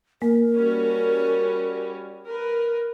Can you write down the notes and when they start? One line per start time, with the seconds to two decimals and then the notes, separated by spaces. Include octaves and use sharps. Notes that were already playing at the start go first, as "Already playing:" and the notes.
0.22 A#3 A#4
0.55 G3 C#4 F#4
2.27 A#4 B4